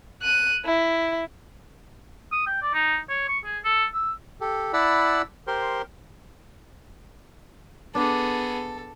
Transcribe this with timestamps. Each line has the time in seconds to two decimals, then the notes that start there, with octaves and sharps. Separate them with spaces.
0.22 F#6 D#7
0.65 E4
2.32 D#6
2.47 G5
2.62 D5
2.74 D#4
3.09 C#5
3.28 C#6
3.45 G#4
3.65 A4
3.94 E6
4.41 G4 A4
4.73 E4 D5 F#5 A5 B5 E6
5.47 G4 A#4 C5 C6
7.95 B3 D4 G#4 A4